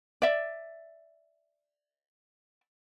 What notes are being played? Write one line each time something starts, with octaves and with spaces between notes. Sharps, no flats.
D5 E5